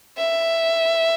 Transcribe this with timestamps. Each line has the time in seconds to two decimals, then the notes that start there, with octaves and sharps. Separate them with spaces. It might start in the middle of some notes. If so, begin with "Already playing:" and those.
0.18 E5